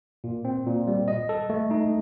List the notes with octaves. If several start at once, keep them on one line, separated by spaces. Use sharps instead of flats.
A#2
C4
A#2
G3
D#5
A4
A3
D#4